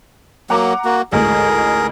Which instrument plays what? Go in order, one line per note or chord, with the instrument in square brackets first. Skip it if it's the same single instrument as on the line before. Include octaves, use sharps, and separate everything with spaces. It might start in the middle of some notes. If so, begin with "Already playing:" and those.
[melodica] F#3 A#3 [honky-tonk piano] F#5 A#5 D6
[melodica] A#3 F#4
[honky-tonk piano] A1 D2 G#2 [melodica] G#4 A#4